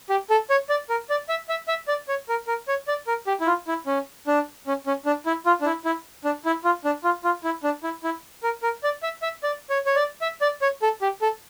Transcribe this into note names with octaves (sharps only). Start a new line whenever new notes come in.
G4
A4
C#5
D5
A#4
D5
E5
E5
E5
D5
C#5
A#4
A#4
C#5
D5
A#4
G4
E4
F4
E4
C#4
D4
C#4
C#4
D4
E4
F4
D4
E4
E4
D4
E4
F4
D4
F4
F4
E4
D4
E4
E4
A#4
A#4
D5
E5
E5
D5
C#5
C#5
D5
E5
D5
C#5
A4
G4
A4